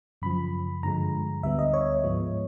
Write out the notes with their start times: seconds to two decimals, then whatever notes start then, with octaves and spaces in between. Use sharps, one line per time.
0.22 F#2 C#3 F3 B5
0.83 G2 D3 F3 G#3 A#5
1.43 D2 D3 G3 B3 E5
1.59 D#5
1.74 C#5
2.04 G#2 F3 G#3 B3